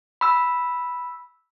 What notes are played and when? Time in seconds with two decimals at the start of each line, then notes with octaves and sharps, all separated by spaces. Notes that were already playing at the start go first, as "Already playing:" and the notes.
0.21 B5 E6